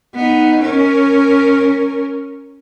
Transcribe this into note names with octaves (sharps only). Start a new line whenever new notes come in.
B3 D#4
C#4 A#4